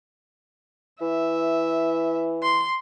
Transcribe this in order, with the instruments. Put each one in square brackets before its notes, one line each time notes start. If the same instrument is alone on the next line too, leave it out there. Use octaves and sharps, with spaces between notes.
[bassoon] E3 [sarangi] E5
[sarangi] C6